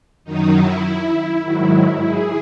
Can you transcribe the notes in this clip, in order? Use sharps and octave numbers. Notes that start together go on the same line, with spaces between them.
F#2 D#3 F#3 D#4
E4
G#2 D#3 F#3
G#4